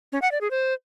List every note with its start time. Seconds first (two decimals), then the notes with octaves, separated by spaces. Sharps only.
0.12 C#4
0.22 F#5
0.32 D5
0.41 G#4
0.51 C5